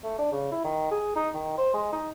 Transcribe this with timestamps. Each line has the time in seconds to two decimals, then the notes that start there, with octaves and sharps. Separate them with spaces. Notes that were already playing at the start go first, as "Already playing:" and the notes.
0.04 A3
0.19 D4
0.32 C#3
0.52 E4
0.65 D#3
0.91 G#4
1.16 D#4
1.34 D#3
1.58 C5
1.74 G#3
1.93 D#4